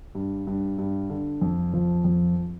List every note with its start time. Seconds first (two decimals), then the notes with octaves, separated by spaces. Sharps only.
0.15 G2
0.47 G2
0.78 G2
1.10 D3
1.41 F2
1.73 F3
2.04 F2